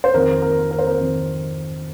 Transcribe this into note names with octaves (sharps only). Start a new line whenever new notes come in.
C5
F2 D#3 A#4
A#4
A#4
C5
A#4
F2 D#3